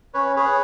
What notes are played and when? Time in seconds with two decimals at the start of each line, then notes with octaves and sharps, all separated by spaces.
0.14 C#4 B4 C#5
0.36 G#4 B4 C#5